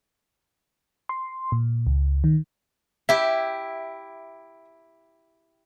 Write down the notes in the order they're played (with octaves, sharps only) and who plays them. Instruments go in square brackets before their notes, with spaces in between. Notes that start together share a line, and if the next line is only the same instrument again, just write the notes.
[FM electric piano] C6
A#2
C#2
D#3
[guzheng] E4 G4 [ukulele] E5